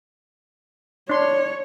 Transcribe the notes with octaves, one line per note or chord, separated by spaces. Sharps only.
D4 C#5 C6